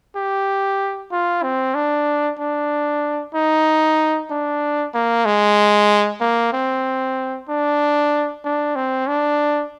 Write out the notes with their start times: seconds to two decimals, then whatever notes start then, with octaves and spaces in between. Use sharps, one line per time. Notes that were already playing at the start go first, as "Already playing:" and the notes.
0.16 G4
1.12 F4
1.43 C4
1.75 D4
2.40 D4
3.34 D#4
4.30 D4
4.94 A#3
5.26 G#3
6.21 A#3
6.53 C4
7.49 D4
8.45 D4
8.76 C4
9.08 D4